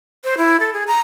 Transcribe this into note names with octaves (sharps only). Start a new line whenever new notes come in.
C5
E4
A4
G#4
A#5